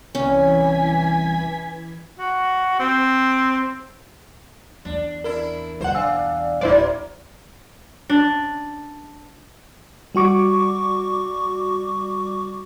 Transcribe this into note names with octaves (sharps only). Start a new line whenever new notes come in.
C2 E3 C#4 G#5 G#6 B6
F#4
C4
E2 D4
D4 E4 A#4
G1 E2 B2 C5 F#5
D4 F5 G#5 E6
D1 F#3 A#3 E4 C5 D5
D4
G3 F#4 C#6 D6